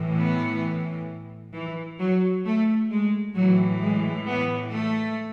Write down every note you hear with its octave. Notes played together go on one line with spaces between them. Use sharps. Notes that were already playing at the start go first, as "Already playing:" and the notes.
Already playing: A2 E3
B3
E3
F#3
A3
G#3
A2 E3 F#3
G#3
B3
A3